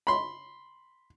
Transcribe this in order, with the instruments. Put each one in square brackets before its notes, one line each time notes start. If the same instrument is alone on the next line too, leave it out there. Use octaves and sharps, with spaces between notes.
[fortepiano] B5 C6